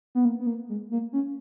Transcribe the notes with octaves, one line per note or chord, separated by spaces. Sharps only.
B3
A#3
B3
A#3
G#3
A#3
C#4